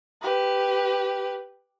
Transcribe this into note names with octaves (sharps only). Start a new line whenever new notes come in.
G4 B4